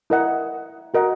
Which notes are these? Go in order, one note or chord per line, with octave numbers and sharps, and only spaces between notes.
E4 A#4 D#5 F#5
F#4 A#4 D#5 F#5